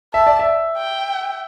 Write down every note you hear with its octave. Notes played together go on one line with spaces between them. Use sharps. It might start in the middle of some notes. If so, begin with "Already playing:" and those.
E5 A5
D5
E5
G5